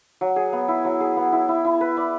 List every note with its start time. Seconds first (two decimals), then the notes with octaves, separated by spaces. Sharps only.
0.21 F#3
0.36 G#4
0.52 B3
0.68 E4
0.85 F#3
1.00 G#4
1.17 B3
1.32 E4
1.48 E4
1.65 E4
1.81 B4
1.97 D5